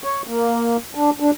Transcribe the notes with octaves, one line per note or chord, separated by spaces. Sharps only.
C#5
A#3
D4
D4